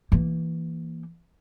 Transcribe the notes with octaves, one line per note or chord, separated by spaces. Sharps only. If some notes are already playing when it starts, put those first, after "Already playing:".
E3 A#3